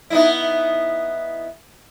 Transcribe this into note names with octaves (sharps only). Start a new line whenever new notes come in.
B3 D#4 E4